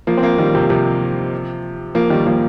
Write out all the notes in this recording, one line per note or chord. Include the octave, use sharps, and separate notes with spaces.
F3 A#3
C4
F3 A#3
D#3 G3
C3 F3
C3 F3
F3 A#3
D#3 G3
F3 A#3